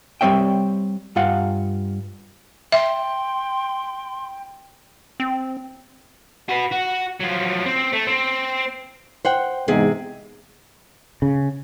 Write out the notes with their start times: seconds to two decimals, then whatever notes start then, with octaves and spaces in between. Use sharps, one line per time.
0.21 G3 C4 C#5 E5 G5
1.16 G2 F4 F5 F#5
2.72 E5 G5 C6
5.20 C4
6.49 F#4 B4
6.71 F#4
7.20 F3 F#3
7.66 C4
7.93 A3
8.07 C4
9.25 C5 F#5 G5
9.68 E2 G#2 C3 G#4
11.22 C#3